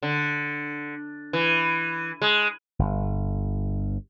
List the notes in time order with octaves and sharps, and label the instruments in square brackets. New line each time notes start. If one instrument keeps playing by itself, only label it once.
[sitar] D3
E3
G#3
[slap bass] G1